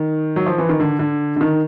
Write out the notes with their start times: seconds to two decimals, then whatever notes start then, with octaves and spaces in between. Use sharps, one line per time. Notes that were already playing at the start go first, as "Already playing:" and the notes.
Already playing: D#3
0.36 F#3
0.46 F3
0.58 E3
0.69 D#3
0.80 D3
0.99 D3
1.36 D3
1.41 D#3